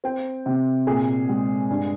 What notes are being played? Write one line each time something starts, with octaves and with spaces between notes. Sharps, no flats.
C4 G5
C3
A#2 G#4
G#3
G2